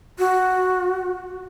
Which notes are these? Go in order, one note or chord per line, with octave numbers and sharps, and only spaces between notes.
F#4